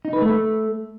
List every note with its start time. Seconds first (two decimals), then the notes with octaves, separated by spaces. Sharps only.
0.05 D#4
0.13 B4
0.22 A3